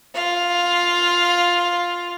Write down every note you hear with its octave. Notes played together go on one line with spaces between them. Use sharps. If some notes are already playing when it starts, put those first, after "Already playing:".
F4 F5